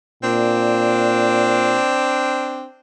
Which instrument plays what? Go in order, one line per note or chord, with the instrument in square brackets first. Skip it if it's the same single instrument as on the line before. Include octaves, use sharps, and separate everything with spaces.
[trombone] A#2 [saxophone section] C4 D4